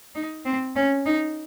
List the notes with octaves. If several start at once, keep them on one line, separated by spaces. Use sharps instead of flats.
D#4
C4
C#4
D#4